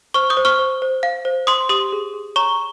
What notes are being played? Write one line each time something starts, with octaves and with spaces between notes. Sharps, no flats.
C5 C#6 F6
D#6 G6
C5
C#6 F6
C5
C5
F5
C5
C5 C6 D#6
G4 C6 D#6
G#4
G#4
C#5 A#5 C#6